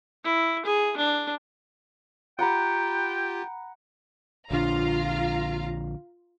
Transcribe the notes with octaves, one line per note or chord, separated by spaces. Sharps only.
E4
G#4
D4
F4 G4 F#5 G5 A#5 B5
A#1 D3 D4 F4 F5 A#5